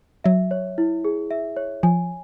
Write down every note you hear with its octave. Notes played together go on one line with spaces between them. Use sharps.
F#3 E5
C#5
E4
G#4
E5
C#5
F3 G#5